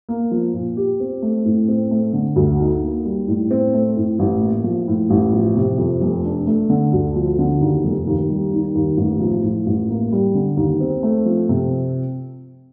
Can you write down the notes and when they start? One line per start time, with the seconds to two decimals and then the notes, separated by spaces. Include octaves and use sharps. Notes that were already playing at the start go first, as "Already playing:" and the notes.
0.09 A#3
0.31 F3
0.54 A#2
0.77 G4
1.00 C4
1.22 A3
1.45 A2
1.68 C4
1.91 A3
2.13 D3
2.36 D2
2.60 D#4
2.83 A#3
3.05 G3
3.28 A2
3.51 C4
3.74 A3
3.97 A2
4.19 A1
4.42 A#3
4.64 F3
4.88 A2
5.10 A1
5.33 F3
5.56 C3
5.78 F2
6.01 F1
6.24 D4
6.47 A3
6.70 D3
6.93 D2
7.16 F3
7.39 D3
7.61 D#2
7.84 F1
8.07 D#2
8.29 G3
8.53 D#3
8.75 D#2
8.97 A1
9.20 F3
9.43 A2
9.66 A1
9.89 A#3
10.12 G3
10.35 D3
10.57 D#2
10.80 C4
11.03 A3
11.26 F3
11.49 C3